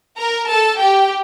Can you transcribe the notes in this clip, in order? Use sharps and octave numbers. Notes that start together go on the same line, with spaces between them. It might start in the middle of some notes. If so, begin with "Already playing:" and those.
A#4 A#5
A4 A5
G4 G5